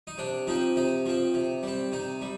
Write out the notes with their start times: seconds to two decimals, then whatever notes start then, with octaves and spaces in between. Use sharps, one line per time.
0.07 D#4
0.18 C3 D4
0.47 F3 C4 D#4
0.76 C3 D#4
1.06 F3 C4
1.34 C3
1.63 G3 C4
1.92 C3 D#4
2.22 G3